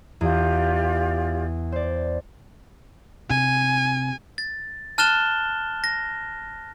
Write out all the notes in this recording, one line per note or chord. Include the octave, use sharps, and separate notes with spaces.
E2 F4 G4 D5
C5 D5
C3 G#5
A6
A5 F6 F#6 A6 E7 G7
A#6